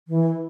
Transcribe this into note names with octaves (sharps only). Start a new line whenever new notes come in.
E3